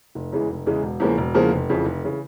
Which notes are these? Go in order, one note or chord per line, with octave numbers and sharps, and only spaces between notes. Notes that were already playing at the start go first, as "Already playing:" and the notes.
F1
E2 C#3 E3 G#3
F1
E2 C#3 E3 G#3
E1
E2 C#3 F3 A#3
E1
E2 C#3 F3 A#3
F1
F2 C#3 E3
F1
C#3 E3